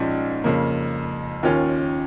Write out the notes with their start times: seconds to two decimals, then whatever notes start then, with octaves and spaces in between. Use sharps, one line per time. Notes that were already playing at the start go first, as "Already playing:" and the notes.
Already playing: A#1 G#2 F3 G#3 C#4
0.44 F2 C#3 A#3
1.43 D#2 D#3 C#4 F4